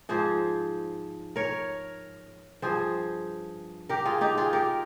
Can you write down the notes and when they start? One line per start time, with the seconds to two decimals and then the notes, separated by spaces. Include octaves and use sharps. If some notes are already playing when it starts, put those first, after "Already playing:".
0.09 G#2 F3 G#4 C5
1.36 A#4 C#5
2.62 G2 F3 G#4 C5
3.89 G4 A#4
4.05 F4 G#4
4.21 D#4 G4
4.37 F4 G#4
4.53 G4 A#4